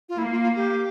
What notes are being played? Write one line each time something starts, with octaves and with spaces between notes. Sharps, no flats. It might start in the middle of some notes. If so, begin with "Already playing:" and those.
F4
A#3 E4
F4
F4
G4